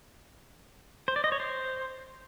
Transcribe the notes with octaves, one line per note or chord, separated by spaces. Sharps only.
C5
D5
D#5
C#5
C5